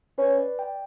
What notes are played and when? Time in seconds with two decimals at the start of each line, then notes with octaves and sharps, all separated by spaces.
0.18 C#4 B4
0.38 D5
0.59 G5